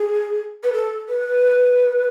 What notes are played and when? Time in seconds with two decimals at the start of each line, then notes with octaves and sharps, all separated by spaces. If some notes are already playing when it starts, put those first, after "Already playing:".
Already playing: G#4
0.63 B4
0.73 A4
1.08 B4